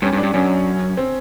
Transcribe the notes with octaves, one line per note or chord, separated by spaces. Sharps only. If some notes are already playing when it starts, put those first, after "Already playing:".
G2 C#4
G2
D4
G2
F#2 C#4
C4